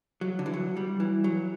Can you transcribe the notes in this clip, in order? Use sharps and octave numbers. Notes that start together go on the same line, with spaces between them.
F#3
D3
E3
F#3
G3
E3
F#3